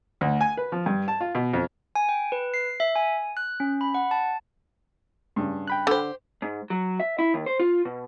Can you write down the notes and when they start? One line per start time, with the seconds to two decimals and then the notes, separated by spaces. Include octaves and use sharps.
0.21 D2
0.41 G#5
0.57 B4
0.72 F3
0.86 G2
1.08 A5
1.21 F4
1.35 B2
1.53 F2
1.95 G#5
2.09 G5
2.32 B4
2.54 C7
2.80 E5
2.96 G#5
3.37 F#6
3.60 C#4
3.81 B5
3.94 F#5
4.11 A5
5.36 G2 C#3
5.68 G5 B5 F#6
5.87 D3 G4 C5
6.42 G#2
6.70 F#3
7.00 E5
7.19 E4
7.34 D#2
7.46 C5
7.60 F4
7.85 B2